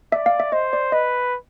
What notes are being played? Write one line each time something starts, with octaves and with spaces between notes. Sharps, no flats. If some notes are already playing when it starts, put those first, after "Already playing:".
D5 E5
F5
E5
C5 D#5
D5
B4 D#5